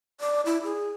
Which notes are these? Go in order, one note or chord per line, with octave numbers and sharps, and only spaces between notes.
D5
E4
G#4